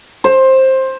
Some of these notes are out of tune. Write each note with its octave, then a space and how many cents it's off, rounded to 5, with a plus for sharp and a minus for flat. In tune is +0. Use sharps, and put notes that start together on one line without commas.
C5 +15